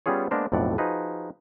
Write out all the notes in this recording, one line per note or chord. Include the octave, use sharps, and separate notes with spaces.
G3 B3 C#4 F4 G#4 C#5
G#3 A#3 B3 D4 A#4 C5
B1 F2 A2 A3 D5 F#5
F3 D#4 F#4 G#4 B4